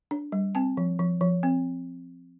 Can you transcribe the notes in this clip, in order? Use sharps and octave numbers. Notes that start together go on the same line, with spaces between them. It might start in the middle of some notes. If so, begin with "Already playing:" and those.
D4
G3
C4 A5
F3
F3
F3
C4